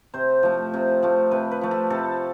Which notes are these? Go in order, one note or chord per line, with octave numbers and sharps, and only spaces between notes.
C3 C5
F3 A3
C3
F3 A3
C3 B4
B4
F3 A3
A4
C3 A4